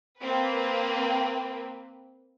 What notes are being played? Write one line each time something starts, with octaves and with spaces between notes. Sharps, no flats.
A#3 C4 B4